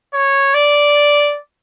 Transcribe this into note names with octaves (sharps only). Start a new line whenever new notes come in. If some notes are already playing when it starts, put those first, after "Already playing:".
C#5
D5